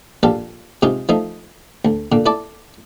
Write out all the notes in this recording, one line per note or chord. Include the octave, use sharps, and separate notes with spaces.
A#1 G3 A4 F5
C3 G#3 D#4 F4
F3 A3 D#4
D2
A#2 D3
E4 A4 D5